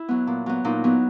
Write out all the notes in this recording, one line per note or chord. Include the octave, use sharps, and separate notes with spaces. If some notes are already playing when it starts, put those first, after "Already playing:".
Already playing: E4
F#3 B3
A#2
F#3 B3
A#2 D#4
F#3 B3